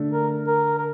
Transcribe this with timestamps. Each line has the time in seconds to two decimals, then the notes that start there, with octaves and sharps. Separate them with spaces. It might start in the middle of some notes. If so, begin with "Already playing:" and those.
Already playing: D3 A3 D4
0.12 A#4
0.47 A#4
0.78 A#4